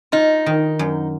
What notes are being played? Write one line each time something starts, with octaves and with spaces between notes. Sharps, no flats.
D#4 F4
D#3
F#2